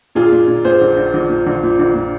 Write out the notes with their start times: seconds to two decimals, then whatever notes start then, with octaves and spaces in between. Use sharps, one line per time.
0.15 A#2 F4 G#4
0.32 A#2
0.48 A#2
0.65 A#2 G#4 C5
0.81 A#1
0.97 A#1
1.14 A#1
1.30 A#2
1.47 A#1
1.63 A#2
1.79 A#1
1.95 A#2